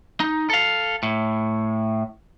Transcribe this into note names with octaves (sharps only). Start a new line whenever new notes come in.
D#4
A4 F5
A2